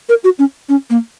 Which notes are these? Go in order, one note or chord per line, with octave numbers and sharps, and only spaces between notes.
A#4
F#4
C#4
C#4
A#3